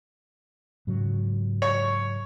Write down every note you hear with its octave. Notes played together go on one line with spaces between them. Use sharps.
G#2 C#3 F#3
C#5